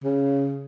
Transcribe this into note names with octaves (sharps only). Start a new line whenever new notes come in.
C#3